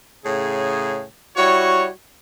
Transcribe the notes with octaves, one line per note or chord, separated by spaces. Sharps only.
A2 C#3 G#4
G3 E4 F#4 C#5